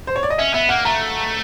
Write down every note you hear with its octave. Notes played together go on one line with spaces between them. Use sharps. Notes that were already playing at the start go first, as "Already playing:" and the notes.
C5
C#5
D5
D#5
C#4 E5
B3 E5
A#3 F#5
A3 A#5